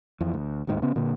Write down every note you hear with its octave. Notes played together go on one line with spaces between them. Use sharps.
F2 E3
D2
D1 D#2 G#2 D#3
C#3 B3 C#4
A#2 D3 A#3